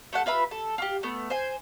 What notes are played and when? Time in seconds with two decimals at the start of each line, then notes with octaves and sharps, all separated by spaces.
0.13 A3 A4 F#5
0.26 F4 B4 E5 B5
0.51 A4
0.78 F4 G4
1.03 A3 B3
1.30 C5 G#5